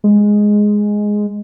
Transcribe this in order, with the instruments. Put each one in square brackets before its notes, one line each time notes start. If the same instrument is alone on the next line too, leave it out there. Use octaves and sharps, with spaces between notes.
[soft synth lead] G#3